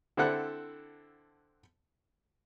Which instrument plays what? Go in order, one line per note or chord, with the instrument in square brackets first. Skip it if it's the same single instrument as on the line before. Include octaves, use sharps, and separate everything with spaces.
[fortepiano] D3 C4 E4 A4 F#5 F#6